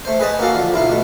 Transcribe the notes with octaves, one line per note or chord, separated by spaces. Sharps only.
A3 C5
G#4 B4 D#5 G#5 A5
A#3 C#4 F#4 A4 F5
D3 F3
B1 E4 F4 F5
B2 A3